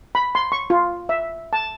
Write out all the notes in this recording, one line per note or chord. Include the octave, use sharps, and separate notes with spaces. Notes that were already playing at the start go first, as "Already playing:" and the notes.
B5
C6
C#6
F4
E5
A5